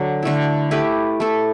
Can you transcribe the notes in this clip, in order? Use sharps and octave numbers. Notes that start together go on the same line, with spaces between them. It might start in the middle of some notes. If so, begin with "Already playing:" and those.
Already playing: D3 F#3
D3 A3 E4
A3 E4 G4 B4
A3 E4 A4